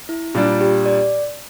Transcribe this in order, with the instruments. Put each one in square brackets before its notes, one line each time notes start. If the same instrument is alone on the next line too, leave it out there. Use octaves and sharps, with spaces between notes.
[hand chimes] E4
[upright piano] A#2 G3 D4 [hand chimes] F4
[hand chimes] G4
D5